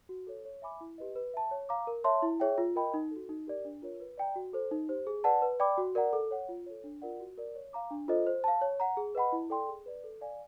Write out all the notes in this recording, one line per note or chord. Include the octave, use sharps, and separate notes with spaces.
F#4
A4 C#5
C#5
E5 G#5 B5 D6
E4
G4 B4 D#5
B4
E5 A5
C#5
F5 A#5 D6
A#4
C#5 E5 A5 C6
E4
G#4 C#5 E5 G5
F4
A#4 D#5 G5 B5
D#4
F#4 A4
D#4
G4 A#4 D5
D4
F4 A#4 C#5
B4
D5 G5 A#5
F#4
A4 C5
D#4
G4 C5
G#4
B4 D5 F#5 A5
B4
D5 G5 B5 D6
F#4
A#4 D5 F#5 A#5
A4
C#5 F#5
F4
A4 C#5
D4
F4 A#4 D5 F#5
F#4
A#4 D5
C#5
F5 A#5 D6
D4
F4 A4 C5 D#5
C5
F5 A5
C#5
F#5 A#5
G#4
B4 D#5 F#5 B5
E4
A4 D5 G5 C6
G#4
B4 D5
A4
D5 F5 G#5